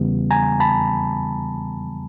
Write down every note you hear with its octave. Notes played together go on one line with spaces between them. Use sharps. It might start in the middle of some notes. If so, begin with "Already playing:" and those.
Already playing: E2 C#3 E3 G3 B3
G#5 A#5
A5 B5